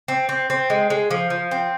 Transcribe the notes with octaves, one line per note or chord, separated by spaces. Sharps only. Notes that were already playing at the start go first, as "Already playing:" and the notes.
C4
C4
C4
G#3
G#3
F3
F3
C4